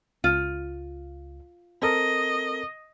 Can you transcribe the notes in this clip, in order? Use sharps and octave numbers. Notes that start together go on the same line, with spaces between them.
C#2 F4
C4 A4 A#4 D#5